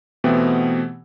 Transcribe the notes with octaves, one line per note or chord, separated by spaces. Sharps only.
B2 E3 A3 B3 C4 G4